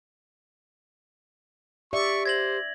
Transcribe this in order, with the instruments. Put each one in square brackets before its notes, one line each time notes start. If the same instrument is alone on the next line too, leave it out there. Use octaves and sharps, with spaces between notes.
[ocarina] G4 [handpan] D5 E5 [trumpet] C#6
[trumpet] C5 [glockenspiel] G#6 A#6 F#7